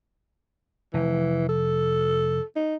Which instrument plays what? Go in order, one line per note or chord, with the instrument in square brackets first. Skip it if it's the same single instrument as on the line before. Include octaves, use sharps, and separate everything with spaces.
[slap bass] F1 [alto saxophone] E3
[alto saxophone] A4
D#4